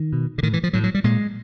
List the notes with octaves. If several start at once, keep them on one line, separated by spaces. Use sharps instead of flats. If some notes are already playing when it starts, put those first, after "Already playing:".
Already playing: D#3
B2
D3
A2 D#3
E3
F3
A2 F#3
F#3
G3
A#2 G#3